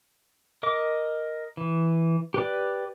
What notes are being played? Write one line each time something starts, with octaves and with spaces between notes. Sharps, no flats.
A#4 D#5 D6
E3
G4 B4 D5